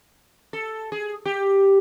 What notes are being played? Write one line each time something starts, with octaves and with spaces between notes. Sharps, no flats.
A4
G#4
G4